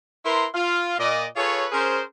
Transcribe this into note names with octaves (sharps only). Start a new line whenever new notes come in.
E4 A#4 B4 A#5 C6
F4
A#2 D5 D#5
F4 G#4 A4 B4 C#5
C#4 G#4 A#4 C5